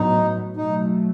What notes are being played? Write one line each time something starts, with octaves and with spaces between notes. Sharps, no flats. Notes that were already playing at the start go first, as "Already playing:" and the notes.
Already playing: A2 F#3 B3 D#4
B2 F#3 A3 D#4